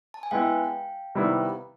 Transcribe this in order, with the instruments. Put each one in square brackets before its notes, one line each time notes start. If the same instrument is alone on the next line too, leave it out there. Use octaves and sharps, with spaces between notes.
[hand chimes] A5
G#5
[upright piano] G#3 B3 E4 [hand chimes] F5 G5
[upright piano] C3 D#3 G3 B3 E4